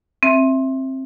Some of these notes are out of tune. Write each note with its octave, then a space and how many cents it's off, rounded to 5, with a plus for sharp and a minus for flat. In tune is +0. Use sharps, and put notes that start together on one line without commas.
C4 +20 E5 +0